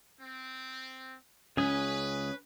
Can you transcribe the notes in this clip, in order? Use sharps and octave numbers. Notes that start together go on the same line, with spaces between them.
C4
C#2 C#4 G#4 B4